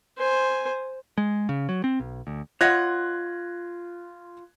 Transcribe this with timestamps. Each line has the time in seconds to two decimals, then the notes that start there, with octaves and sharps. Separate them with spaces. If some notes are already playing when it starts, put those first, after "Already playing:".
0.18 C5 G#5
1.18 G#3
1.49 C#3
1.69 F#3
1.84 C4
2.00 B1
2.27 D2
2.61 F4 C#5 D#5 F#5 F#6 G#6 A#6